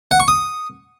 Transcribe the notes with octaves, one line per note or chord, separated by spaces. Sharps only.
F#5
C#6
D#6